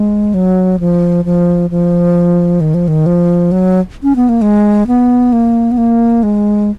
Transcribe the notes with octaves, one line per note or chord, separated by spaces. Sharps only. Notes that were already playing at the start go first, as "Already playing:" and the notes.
Already playing: G#3
F#3
F3
F3
F3
D#3
F3
D#3
F3
F#3
C#4
B3
A#3
G#3
B3
A#3
B3
A#3
G#3